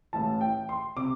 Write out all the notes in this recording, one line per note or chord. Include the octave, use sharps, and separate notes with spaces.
A1 A2 E3 A5
G5
C6
C3 D6